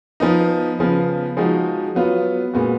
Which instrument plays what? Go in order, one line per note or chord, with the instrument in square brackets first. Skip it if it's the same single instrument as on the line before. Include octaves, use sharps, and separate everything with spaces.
[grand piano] F3 B3 D#4
C#3 F3 B3
F3 G#3 D#4 F#4
F#3 B3 F4
A#2 G#3 B3 F#4